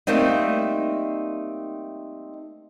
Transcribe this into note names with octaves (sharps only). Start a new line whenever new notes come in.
G3 A3 A#3 C4 D#4